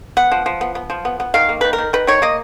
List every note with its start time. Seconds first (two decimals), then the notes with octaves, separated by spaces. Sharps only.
0.17 B3 F#5
0.32 F3
0.46 F3
0.61 B3
0.75 B3
0.90 F3
1.05 B3
1.20 B3
1.34 D#3 F5
1.49 A#3
1.61 D#3 B4
1.73 A#4
1.78 D#3
1.93 D#3 B4
2.07 D#3 C#5
2.22 A#3 D#5